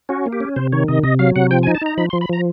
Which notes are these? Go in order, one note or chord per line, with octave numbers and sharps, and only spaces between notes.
C#4 F#4
A#3
G4
C#4
C3 C5
D#3 C#5
C3 D#5
C3 D#5
F#3 F5
C3 F#5
F3 G5
G#5
D#4
A5
D#4 A#5
F3 B5
F3 C6
B5
F3 A#5